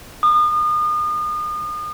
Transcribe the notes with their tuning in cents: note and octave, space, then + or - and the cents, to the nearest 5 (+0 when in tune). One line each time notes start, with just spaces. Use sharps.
D#6 -35